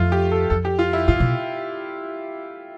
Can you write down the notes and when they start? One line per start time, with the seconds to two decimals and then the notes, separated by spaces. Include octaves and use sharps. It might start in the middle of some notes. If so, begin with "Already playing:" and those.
Already playing: F2 A3 F4
0.12 G4
0.32 A4
0.50 F2 A4
0.65 G4
0.79 F4
0.93 E4
1.08 A2 F4
1.20 B2